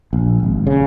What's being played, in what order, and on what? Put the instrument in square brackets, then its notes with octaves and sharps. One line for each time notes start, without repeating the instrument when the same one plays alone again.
[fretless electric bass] A#1
G#1
C#3